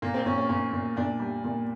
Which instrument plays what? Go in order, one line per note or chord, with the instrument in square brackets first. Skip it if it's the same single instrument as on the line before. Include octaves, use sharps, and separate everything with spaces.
[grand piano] A#2 [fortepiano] A#3
[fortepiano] C4
[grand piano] A#2 [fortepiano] C#4
[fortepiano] C#4
[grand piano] A#2 [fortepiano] C#4
[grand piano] A#2
[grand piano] A#2 [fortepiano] D4
[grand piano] G3
A#2